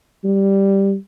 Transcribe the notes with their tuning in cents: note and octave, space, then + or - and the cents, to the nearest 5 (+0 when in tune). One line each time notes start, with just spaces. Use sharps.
G3 +0